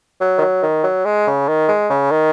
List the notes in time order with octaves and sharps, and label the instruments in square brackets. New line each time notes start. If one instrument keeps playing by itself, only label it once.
[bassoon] F#3
D#3
F#3
D#3
F#3
G#3
C#3
D#3
G#3
C#3
D#3